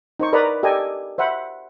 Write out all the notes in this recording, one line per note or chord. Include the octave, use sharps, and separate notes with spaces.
D#4 C5 C#6
A#4 B4 D5 D#5 A#5 B5
G4 A4 D5 D#5 G5 G#5
C5 E5 F#5 B5